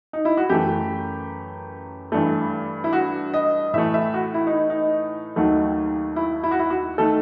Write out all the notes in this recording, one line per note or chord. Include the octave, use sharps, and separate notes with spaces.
D#4
E4
F#4
F#2 E3 A3 G4
G2 E3 A3
E4
F#4
D#5
A2 E3 A3 E5
E5
F#4
E4
D#4
D#4
D#2 D#3 F#3 A3
E4
E4
F#4
E4
F#4
D#3 A3 A4